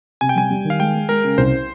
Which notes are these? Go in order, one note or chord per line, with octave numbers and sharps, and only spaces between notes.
C3 G#5
G5
G3 G#5
G3
D#3
F5
G#3 G5
G#3
G#3 A#4
C#3
C2 C5